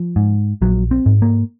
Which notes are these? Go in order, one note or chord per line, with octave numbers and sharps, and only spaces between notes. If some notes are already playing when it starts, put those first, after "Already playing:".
Already playing: F3
G#2
A#1 F#3
C4
G#2
A#3